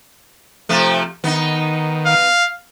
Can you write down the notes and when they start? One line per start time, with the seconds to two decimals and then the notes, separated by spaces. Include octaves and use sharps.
0.69 C3 F3 A3
1.24 D#3 B3 D#4
2.06 F5